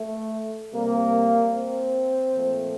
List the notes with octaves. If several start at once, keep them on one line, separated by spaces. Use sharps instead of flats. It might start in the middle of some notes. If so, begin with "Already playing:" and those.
Already playing: A3
C3 G3 A#3
C4
A#2 F3 A3